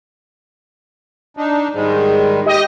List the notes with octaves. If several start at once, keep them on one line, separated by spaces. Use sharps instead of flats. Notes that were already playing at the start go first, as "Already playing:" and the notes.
D4 D#4
G#2 D#3 G3 G#3
G4 D#5